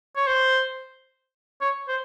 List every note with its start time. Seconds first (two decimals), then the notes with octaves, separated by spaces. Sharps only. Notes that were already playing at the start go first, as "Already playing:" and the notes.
0.16 C#5
0.27 C5
1.61 C#5
1.88 C5